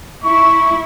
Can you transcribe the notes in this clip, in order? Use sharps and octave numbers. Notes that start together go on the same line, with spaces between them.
E4 C#6